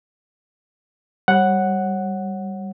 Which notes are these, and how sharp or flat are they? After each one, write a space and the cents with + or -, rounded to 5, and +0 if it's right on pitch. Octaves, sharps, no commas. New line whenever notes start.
G3 +0 C#5 -25 F#5 +0